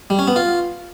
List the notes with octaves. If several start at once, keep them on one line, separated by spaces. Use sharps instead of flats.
G3
C#4
B3
F4